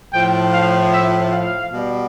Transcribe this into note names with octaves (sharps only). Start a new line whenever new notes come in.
A2 F3 G5
F5
E5
F5
B2 G3